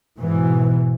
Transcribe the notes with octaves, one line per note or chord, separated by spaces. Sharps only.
G#2 B2 E3